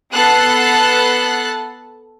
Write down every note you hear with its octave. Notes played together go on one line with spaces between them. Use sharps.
B3 A4 F#5 A5 F#6 C7